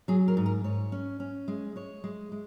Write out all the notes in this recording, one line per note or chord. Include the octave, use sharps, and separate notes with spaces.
F#3 G#4
A#4
G#2
A#4
G#2 C#5
C#4
C#4
G#3
G#3 C#5
G#3
G#3